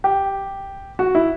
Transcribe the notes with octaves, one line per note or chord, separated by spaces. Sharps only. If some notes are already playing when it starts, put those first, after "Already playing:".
G4
F#4
E4